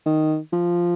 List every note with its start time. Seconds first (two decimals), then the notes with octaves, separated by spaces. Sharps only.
0.06 D#3
0.53 F3